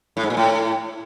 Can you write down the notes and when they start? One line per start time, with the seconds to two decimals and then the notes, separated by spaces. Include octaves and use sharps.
0.17 A2
0.23 G#2
0.30 A#2
0.37 A2